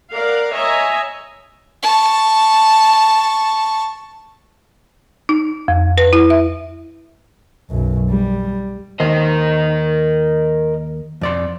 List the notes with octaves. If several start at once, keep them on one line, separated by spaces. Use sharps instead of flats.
A#4 D5 F5 F#5
C#5 D#5 E5 G#5 A#5
A5 C#6
D#4
F2
B4
E4
E5
B1 F#2
G3
D#2 D#3 A#4 C5 D#5
F2 D5 C6